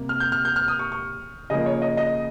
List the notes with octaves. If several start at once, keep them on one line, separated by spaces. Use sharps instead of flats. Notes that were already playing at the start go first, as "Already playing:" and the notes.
Already playing: C3 G3 A#3
F6
G6
F6
G6
F6
D#6
C#6
C#6
C#3 F3 A#3 D#5
C#5
D#5
D#5